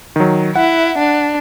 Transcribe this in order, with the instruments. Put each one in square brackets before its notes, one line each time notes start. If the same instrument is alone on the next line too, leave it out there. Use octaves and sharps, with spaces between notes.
[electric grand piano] D#3 F#3
[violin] E4 [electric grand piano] F#5
[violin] D4